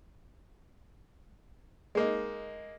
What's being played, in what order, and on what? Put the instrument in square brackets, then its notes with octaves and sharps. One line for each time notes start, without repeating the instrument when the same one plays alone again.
[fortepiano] G#3 A#3 D#4